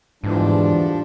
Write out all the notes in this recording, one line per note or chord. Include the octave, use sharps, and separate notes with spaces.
E2 G#2 D3 E3 F3 G3 D4